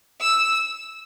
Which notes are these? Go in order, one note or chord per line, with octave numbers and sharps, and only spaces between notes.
E6